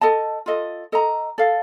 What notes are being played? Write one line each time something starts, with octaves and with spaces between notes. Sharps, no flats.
A4 D#5 A5
F4 A4 D#5
A4 D#5 A#5
A4 D5 F5